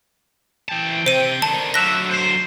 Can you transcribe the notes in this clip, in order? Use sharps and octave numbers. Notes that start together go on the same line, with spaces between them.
E3 C4 G5 A5
C3 C5 D#7
D3 D#3 A5
D3 F#3 F4 E5 F#6 A#6
C5